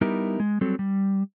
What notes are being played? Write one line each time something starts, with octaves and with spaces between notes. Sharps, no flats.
G3 B3 D#4 E4 G4 A#4
G#3
F#3 G3 C4 A4
G3